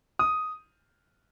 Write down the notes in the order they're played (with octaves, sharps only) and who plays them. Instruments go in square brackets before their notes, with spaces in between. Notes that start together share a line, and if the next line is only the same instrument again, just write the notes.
[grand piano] D#6